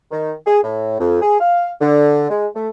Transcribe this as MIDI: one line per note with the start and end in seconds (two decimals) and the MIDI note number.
0.11 0.33 51
0.47 0.59 68
0.63 0.99 45
1.00 1.18 41
1.22 1.37 68
1.40 1.69 77
1.81 2.27 50
2.30 2.46 56
2.56 2.69 57